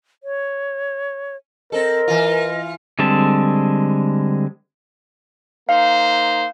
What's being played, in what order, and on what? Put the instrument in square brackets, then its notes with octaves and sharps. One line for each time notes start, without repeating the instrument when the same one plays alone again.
[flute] C#5
[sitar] C4 A4 [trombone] A#4 [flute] D#5
[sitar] E3 F4
[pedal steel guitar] D3 G3 G#3 C4 A5
[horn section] A#3 D#4 C5 [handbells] F5